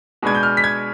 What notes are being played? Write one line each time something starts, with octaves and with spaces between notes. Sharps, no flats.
B2 G#3 B3 D4 G#6
G6
F6
B6
G#6